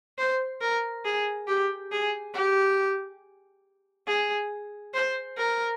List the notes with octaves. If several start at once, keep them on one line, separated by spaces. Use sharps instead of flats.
C5
A#4
G#4
G4
G#4
G4
G#4
C5
A#4